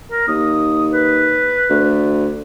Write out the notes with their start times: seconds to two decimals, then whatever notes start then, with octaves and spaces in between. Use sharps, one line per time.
0.12 A#4
0.28 D#2 D#6
0.93 B4
1.69 D2